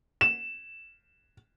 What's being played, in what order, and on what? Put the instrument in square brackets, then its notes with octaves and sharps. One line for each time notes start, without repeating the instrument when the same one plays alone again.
[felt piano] E7